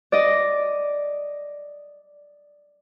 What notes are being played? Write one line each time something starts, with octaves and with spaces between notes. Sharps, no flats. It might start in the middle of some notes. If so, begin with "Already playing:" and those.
D5 D#5